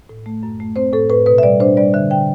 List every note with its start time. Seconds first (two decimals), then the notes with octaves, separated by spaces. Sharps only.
0.09 A2
0.26 A3
0.43 F#2
0.60 A3
0.76 C4 C5
0.93 A2 A4
1.10 A2 B4
1.26 B2 B4
1.38 E5
1.43 G3 D5
1.60 D4 C5
1.77 G3 D5
1.94 D3 E5
2.11 D3 G5